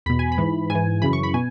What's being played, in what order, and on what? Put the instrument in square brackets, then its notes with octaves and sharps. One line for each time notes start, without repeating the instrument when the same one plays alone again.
[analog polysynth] E2 B2 B5
G#5
B5
G#2 E3
G#2 G#5
E3
F#2 C#3 E3 B5
C#6
B5
B2 G#5